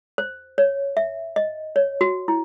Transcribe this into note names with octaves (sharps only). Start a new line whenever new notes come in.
C5
C#5
E5
D#5
C#5
F#4
E4